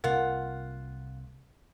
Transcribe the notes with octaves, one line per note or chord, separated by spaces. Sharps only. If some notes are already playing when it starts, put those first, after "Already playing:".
C2 C3 A#3 F4 A#4 F#5